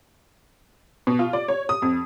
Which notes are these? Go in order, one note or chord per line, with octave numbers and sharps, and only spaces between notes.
B2
F4
D5
C#5
D#6
F2